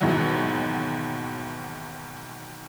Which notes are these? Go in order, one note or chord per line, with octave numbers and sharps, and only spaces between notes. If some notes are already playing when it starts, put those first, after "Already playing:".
D#2 G#2 B2 E3 F#3 B3